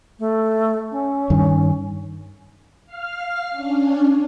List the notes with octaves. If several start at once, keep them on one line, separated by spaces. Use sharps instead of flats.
A3
C#4
G2 D#3
F5 F6
C#4 D4